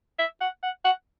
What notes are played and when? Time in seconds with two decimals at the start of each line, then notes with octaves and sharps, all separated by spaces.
0.19 E5
0.41 F#5
0.63 F#5
0.84 F#5